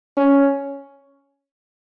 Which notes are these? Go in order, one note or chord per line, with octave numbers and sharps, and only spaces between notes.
C#4